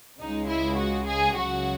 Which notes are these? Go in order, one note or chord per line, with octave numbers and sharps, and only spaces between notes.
C#2 C#3 G#3 D#4
E4
F#4
G#4
C#2 C#3 F#3 F#4